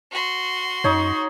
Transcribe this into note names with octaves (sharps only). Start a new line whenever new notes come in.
F#4 C6
F#2 D#4 C#5